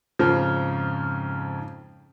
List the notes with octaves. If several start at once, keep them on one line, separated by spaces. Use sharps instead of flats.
F2 G#2 C#3 F3